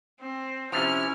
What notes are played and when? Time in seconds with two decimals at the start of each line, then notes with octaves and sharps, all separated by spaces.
0.21 C4
0.72 C3 F3 C#4 E4 F6